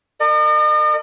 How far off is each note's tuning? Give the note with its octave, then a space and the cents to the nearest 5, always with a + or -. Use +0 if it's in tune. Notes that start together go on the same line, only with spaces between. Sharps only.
A#4 -35 D#5 -45